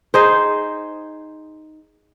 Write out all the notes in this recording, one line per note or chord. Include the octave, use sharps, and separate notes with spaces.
D#4 G#4 C5